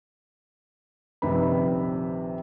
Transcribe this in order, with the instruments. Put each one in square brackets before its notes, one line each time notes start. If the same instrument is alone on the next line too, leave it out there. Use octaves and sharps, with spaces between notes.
[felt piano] A#1 C3 D#3 B4 B5